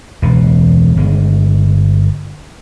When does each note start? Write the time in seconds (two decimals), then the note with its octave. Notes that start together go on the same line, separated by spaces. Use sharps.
0.22 E1 C#2 B2
0.96 G1 G#3